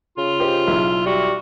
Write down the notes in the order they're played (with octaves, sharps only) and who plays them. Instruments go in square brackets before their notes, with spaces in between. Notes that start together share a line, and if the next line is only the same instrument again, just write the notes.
[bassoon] C#3 [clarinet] F4
[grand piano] G4 C5 D#5
B1 E4 E5
[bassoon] G3 [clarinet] F#4